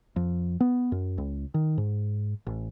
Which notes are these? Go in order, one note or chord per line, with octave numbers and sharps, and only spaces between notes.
F2
B3
F#2
C#2
D#3
G#2
A1